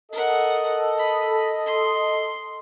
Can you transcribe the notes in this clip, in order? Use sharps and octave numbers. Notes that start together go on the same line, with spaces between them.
A4 A#4 D#5 F#5
B5
C6